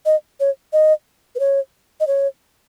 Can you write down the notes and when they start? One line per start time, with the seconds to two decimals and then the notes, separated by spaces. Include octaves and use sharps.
0.06 D#5
0.40 C#5
0.73 D#5
1.35 B4
1.40 C#5
2.00 D#5
2.07 C#5